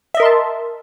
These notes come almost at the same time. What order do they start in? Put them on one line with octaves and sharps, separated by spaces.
E5 D#5 A#4 C6 A5